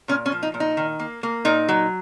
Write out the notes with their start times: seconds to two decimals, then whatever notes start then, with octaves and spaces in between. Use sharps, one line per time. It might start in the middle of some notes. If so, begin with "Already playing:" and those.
0.08 A#2 C#4
0.26 C#4
0.32 F3
0.43 D#4
0.54 A#2
0.60 D#4
0.77 D#3
1.00 A#3
1.23 A#3
1.45 A#2 D#4
1.69 F#3